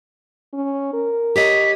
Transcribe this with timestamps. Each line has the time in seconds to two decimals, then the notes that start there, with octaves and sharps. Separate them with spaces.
0.53 C#4
0.93 A#4
1.36 G4 C#5 D#5 B6